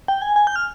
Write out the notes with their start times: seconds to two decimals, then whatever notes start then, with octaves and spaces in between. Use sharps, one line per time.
0.08 G5
0.22 G#5
0.36 G#5
0.47 G6
0.56 F6